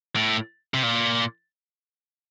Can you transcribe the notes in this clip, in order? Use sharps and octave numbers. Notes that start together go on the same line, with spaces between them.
A2
C3
A#2